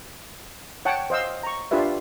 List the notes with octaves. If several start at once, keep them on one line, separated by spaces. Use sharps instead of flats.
C#5 F#5 G5 A5
C5 D#5 F5 E6
A#5 C#6
D4 F4 G4 B4 E5